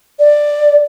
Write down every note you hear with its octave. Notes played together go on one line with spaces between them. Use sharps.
D5